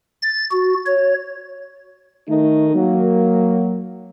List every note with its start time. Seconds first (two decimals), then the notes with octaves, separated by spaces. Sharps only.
0.22 A6
0.51 F#4
0.86 C#5
2.29 D#3 A3 D#4
2.74 F#3 A#3